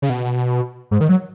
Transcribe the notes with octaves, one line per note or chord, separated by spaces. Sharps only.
C#3
B2
G#2
D#3
F#3